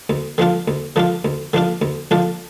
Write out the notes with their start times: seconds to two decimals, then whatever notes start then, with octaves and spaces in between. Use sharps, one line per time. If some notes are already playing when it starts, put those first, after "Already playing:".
0.10 D2
0.38 D3 F3 D4 F4
0.68 D2
0.96 D3 F3 D4 F4
1.25 D2
1.53 D3 F3 D4 F4
1.82 D2
2.11 D3 F3 D4 F4